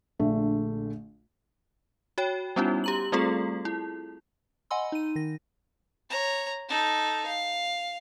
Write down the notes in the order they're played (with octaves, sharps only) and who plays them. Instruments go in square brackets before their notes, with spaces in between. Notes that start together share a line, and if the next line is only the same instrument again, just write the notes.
[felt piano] A#1 D3 A3
[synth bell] F#4 C#5 G5
G3 B3 C#4 D#4 E4 F#4
G4 A#5 F#7
G3 A3 C4 F4 G#4 A4
E4
D#5 F#5 G#5 B5 C6 E6
D#4 D#7
D#3 A#6
[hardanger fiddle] C#5 A#5
D#4 A4
F5